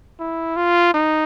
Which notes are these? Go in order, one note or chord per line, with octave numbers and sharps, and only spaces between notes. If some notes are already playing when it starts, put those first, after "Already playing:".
E4
F4
D#4